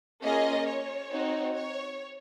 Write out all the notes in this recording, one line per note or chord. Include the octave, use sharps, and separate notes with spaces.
A#3 C#4 F4 G#4 D#5
C#5
C4 D#4 F#4
C#5